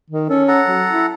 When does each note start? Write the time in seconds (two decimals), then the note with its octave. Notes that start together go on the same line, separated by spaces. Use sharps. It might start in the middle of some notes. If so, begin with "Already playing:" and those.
0.10 D#3
0.30 C#4 A4
0.48 A4 F#5 A#5
0.67 F#3
0.90 E4